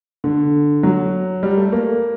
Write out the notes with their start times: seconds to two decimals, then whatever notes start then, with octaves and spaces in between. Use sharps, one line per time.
0.24 D3
0.83 F#3
1.43 G3
1.57 A3
1.72 A#3